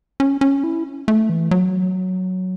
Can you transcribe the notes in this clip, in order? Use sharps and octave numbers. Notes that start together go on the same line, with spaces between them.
C#4
C#4
E4
A3
E3
F#3